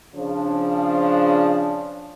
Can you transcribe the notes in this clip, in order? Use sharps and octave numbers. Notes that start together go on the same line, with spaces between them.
C#3 F3 D4